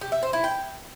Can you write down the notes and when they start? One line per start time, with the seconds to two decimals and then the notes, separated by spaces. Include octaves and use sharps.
0.01 G4
0.12 E5
0.23 C5
0.33 E4
0.44 G5